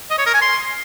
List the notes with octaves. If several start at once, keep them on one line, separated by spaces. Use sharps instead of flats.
D#5
C#5
A#4
G#5
C6